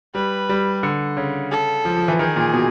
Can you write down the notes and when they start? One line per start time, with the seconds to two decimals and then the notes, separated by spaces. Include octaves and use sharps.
0.14 G3 B4
0.49 G3
0.83 D3
1.17 C#3
1.51 A4
1.85 F3
1.97 F3
2.08 E3
2.19 D#3 G#4
2.36 A#2
2.54 B2